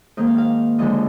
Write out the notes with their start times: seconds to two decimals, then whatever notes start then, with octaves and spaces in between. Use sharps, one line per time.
0.17 G#2 D#3 A#3 D#5
0.27 F5
0.38 F5
0.78 D#2 D3 F3 G#3 D#5